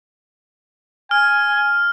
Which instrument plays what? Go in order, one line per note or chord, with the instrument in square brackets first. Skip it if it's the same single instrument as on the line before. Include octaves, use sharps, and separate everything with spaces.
[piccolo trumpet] G#5 [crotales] F6